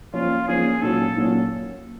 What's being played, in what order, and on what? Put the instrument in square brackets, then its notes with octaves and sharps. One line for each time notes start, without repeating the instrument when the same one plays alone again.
[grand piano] F3 A#3 C#4 [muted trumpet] F4
[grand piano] F3 A#3 C#4 [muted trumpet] G#4
[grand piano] A#2 F#3 A#3 C#4 F#4 [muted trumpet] A4
[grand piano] A#2 F#3 A#3 C#4 F#4